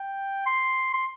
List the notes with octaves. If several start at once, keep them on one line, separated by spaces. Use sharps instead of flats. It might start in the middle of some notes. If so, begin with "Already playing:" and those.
Already playing: G5
C6
C6